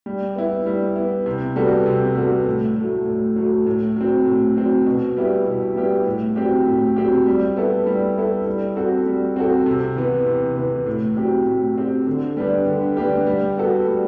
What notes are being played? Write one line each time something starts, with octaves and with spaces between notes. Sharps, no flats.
G3
B3 E4
G3
B3 E4
C3
G3 B3 F#4 A4
C3
G3 B3 F#4 A4
A2
F#3 A3
A2
F#3 A3
A2
F#3 C4
A2
F#3 C4
B2
G3 B3 E4 G4
B2
G3 B3 E4 G4
A2
F#3 C4 G4
A2
F#3 C4 G4
G3
B3 E4 A4
G3
B3 E4 A4
G3
C4 F#4 A4
G3
C4 F#4 A4
C3
E3 B3
C3
E3 B3
A2
F#3 C4 G4
A2
F#3 C4 G4
D3
G3 B3 D4 G4
D3
G3 B3 D4 G4
G3
B3 F#4 A4
G3